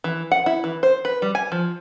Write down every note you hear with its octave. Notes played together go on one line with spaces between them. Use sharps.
E3
F#5
E4
E3
C5
B4
G3
G#5
F3